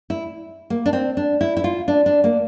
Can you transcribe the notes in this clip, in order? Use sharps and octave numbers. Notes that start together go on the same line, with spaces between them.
E4
A#3
D4
C4
D4
E4
E4
F4
D4
D4
A#3